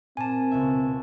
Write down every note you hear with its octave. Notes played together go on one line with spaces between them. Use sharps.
A#2 C4 G#5 A5
C#2 B2 E5